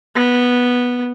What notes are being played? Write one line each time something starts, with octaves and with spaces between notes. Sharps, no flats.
B3